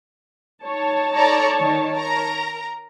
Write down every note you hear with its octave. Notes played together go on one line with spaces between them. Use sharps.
D#4 C#5 A5
A4 D5 A#5
D#3
A#4 A#5